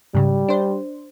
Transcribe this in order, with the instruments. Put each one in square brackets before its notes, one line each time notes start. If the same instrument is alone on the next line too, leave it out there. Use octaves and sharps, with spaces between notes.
[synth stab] G#2 C#3 [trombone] G3
[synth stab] D4 C5